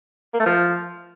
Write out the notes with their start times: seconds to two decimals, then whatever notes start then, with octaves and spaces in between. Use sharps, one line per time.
0.34 A#3
0.40 A3
0.46 F3